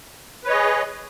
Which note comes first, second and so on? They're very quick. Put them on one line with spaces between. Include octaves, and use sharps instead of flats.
B4 C#5 D#5 G#4